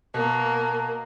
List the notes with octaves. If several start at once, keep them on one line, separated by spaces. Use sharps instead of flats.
B2 A#3